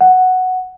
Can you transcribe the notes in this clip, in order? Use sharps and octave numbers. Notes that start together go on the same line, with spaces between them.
F#5